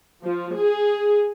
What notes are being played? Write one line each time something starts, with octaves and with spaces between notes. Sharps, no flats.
F3
G#4